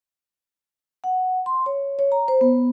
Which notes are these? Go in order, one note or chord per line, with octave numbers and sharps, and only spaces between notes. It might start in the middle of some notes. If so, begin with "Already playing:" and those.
F#5
C6
C#5
C#5
A#5
C5
B3